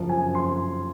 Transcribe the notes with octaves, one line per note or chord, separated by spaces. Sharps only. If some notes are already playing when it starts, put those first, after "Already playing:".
Already playing: F#2 C#3 F3
G#5
C6